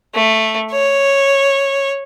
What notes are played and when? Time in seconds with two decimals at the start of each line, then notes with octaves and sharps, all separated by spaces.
0.15 A3
0.71 C#5